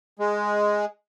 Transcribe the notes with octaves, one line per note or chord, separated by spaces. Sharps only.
G#3